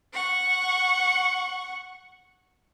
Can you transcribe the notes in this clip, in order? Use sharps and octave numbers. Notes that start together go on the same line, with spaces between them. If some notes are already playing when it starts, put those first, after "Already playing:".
F#5 C#6